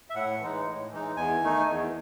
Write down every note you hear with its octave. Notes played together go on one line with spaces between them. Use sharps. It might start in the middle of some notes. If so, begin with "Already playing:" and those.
E5
A2 F#5
E3 G#3 D#4
A2
E3 G#3 D#4
E2 G#5
D#3 A3 D#4
E2